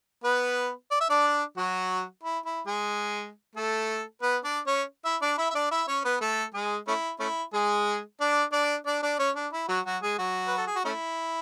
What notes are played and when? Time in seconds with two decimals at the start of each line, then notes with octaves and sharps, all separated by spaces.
0.24 B3 B4
0.91 D5
1.00 E5
1.10 D4 D5
1.57 F#3 F#4
2.23 E4
2.45 E4
2.67 G#3 G#4
3.56 A3 A4
4.22 B3 B4
4.44 D4 D5
4.67 C#4 C#5
5.05 E4 E5
5.22 D4 D5
5.38 E4 E5
5.50 E5
5.54 D4 D5
5.71 E4 E5
5.88 C#4 C#5
6.04 B3 B4
6.21 A3 A4
6.54 G#3 G#4
6.87 A3 C#4 E4
7.20 A3 C#4 E4
7.53 G#3 G#4
8.20 D4 D5
8.52 D4 D5
8.86 D4 D5
9.03 D4 D5
9.19 C#4 C#5
9.36 D4
9.52 E4
9.69 F#3 F#4
9.86 F#3 F#4
10.03 G#3 G#4
10.19 F#3 F#4
10.47 B4
10.58 A4
10.67 G#4
10.76 F#4
10.85 A3 C#4 E4